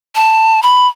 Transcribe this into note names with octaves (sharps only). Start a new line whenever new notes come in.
A5
B5